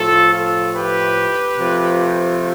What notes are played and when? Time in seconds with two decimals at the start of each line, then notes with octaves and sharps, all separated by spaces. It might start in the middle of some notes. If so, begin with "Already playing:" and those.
Already playing: A2 F3 A3 F4 A4
0.32 F4 A4
0.75 G4 B4
1.58 C3 F3 A3